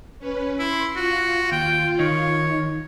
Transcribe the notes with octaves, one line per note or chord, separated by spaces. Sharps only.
C#4 B4
E4 C6
F4 F#4
D#2 G5
D#3 C#5